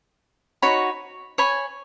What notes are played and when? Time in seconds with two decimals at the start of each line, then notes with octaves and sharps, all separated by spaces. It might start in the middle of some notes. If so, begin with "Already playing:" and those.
0.62 D#4 F#4 C#5 B5
1.38 C#5 G#5 B5